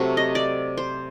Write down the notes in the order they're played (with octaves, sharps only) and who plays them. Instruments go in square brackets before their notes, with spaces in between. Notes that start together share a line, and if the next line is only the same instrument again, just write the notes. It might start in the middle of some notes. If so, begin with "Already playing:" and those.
Already playing: [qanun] C3 F#3 A3
D#5
D5
C5